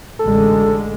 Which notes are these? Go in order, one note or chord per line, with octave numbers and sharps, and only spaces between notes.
A1 D3 G#3 A4